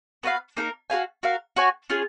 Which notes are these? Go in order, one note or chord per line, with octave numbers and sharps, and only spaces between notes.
B3 F#4 B4 F5
A#3 D#4 A#4
F#4 B4 F5 G#5
F#4 A#4 F5
F#4 C#5 G#5
C#4 F4 G#4